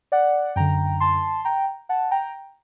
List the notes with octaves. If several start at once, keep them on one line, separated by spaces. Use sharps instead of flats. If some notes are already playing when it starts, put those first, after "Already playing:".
D5 F#5
F#2 D3 G5 A#5
A5 C6
G5 A#5
F#5 A5
G5 A#5